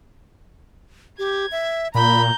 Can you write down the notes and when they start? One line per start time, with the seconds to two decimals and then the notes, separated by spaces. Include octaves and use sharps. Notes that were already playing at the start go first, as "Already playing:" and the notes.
1.19 G4 G#6
1.52 E5
1.95 A#2 A#5 B5 G6